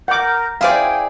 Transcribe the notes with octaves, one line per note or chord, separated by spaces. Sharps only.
A#4 F#5 D6 G6
E4 G#4 C5 D5 F5 G5